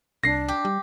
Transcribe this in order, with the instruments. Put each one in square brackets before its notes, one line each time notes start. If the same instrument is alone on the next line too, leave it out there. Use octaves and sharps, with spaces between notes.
[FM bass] C2 [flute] D4 [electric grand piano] A#6 C7
[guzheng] G4
[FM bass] G3